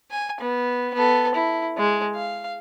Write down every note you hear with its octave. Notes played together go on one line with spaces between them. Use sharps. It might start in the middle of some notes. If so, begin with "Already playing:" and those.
G#5
B3
B3 A4
E4
G#3
F5